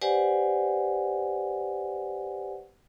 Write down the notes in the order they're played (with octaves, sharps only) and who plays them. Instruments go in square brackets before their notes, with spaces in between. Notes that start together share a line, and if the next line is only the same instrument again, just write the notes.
[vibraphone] G4 B4 C5 D5 F#5 G#5